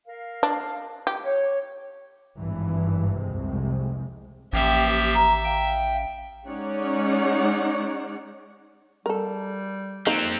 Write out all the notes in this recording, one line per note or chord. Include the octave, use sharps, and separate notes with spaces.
A#4 F5
D4
G4
C#5
G#1 G2 E3
F1 C2 C3 G#3
A1 F3 A#3 G4 E5 G5
A#5
F5 G5
G#3 C#4 D#4 C#5 D5 F#5
G3 A4 A#4
F3 A#3 C4 D#4 A#4